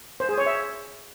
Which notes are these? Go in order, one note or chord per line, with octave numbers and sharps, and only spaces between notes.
C5
G#4
C#5
E5